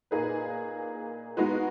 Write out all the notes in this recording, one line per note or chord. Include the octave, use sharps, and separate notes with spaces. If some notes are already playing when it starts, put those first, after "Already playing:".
A#2 A#3 D#4 G#4 B4
G#3 B3 D#4 F#4 B4